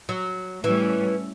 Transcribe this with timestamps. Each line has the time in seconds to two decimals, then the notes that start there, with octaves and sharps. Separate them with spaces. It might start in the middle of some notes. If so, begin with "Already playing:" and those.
0.09 F#3
0.63 A2 E3 G3 C#4